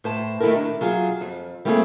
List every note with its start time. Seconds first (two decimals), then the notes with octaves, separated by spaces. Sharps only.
0.04 A2 C5 A5
0.40 D#3 A3 E4 G4 A4 A#4
0.56 D4
0.81 F#3 F4 G#4
1.21 F2
1.65 G3 A3 A#3 C4 E4 G#4